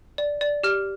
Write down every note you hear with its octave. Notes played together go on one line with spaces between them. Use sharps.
D5
D5
G4 F6